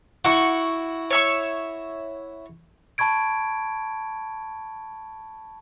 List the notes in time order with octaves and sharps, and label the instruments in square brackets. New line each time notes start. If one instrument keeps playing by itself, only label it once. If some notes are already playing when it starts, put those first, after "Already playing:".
[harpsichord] E4 F#4 [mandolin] F#5 C#6
[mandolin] C#5 E5 C#6
[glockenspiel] A5 B5 C#6 G#6 D7